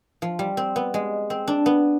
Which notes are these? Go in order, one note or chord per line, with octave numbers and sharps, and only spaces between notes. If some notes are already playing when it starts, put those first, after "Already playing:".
F3
G3
C4
B3
G#3
C4
D4
B3